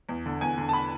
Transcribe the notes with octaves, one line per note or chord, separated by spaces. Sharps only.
E2
D3
E2 G#5
D3
A5
B5